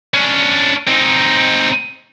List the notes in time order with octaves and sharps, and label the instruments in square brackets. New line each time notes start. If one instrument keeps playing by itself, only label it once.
[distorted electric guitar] C#4 D4
C4 D#4